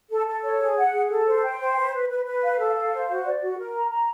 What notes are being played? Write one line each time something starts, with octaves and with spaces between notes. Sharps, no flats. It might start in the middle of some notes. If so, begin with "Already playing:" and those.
A4
A4
C#5
G#4
F#5
G#4
A4
C5
G5
C5
B4
B4
B4
B4
F5
A4
F5
C5
F#4
D5
F#4
A#4
A#5
A#5